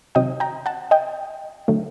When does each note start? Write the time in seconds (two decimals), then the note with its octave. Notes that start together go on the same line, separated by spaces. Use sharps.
0.15 C3 D#3 F#3 C4 D#5 G5
0.40 G5 A#5
0.66 F#5 A5
0.91 D#5 G5
1.68 D3 F#3 A3